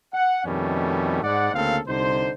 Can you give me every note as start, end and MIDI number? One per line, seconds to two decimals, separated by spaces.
0.13 0.44 78
0.45 1.22 41
0.45 1.22 47
0.45 1.22 51
0.45 1.22 55
0.45 1.22 57
0.45 1.22 61
1.23 1.52 44
1.23 1.52 74
1.23 1.52 78
1.53 1.78 38
1.53 1.78 49
1.53 1.78 58
1.53 1.78 60
1.53 1.78 69
1.53 1.78 77
1.86 2.31 36
1.86 2.31 50
1.86 2.31 63
1.86 2.31 72